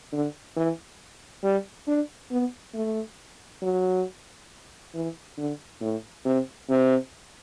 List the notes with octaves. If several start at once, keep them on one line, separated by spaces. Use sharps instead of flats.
D3
E3
G3
D4
B3
A3
F#3
E3
D3
A2
C3
C3